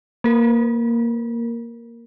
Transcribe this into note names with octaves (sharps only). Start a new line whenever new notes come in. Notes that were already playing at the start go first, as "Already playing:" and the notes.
A#3 A#4